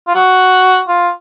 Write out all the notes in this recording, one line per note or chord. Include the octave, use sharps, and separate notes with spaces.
F4
F#4
F4